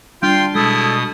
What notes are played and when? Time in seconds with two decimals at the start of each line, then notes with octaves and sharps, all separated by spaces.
0.22 G3 D4 F4 F5 G5 C6
0.55 B2 G#3 E4 A4 D#6